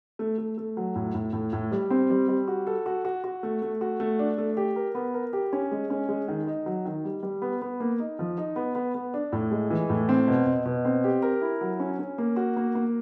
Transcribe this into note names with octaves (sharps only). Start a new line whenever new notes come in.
A3
A3
A3
F#3
A2
A2
A2
A2
G3
C4
G3
G3
F#4
A4
F#4
F#4
F#4
A3
A3
F#4
A3
D4
A3
G4
A#4
B3
A#4
G4
C#4
G#3
C#4
G#3
D#3
D#4
F#3
D#3
G3
G3
B3
B3
A#3
D#4
F3
D#4
B3
B3
B3
D4
A2
G#3
E3
A2
C4
B2
B2
B2
C4
G4
A#4
E4
F#3
C#4
C#4
A#3
F#4
A#3
A#3